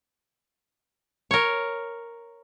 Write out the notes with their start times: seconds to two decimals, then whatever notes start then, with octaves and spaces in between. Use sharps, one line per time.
1.31 A#4 C#5